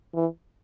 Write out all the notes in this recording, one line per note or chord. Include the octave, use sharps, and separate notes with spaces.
E3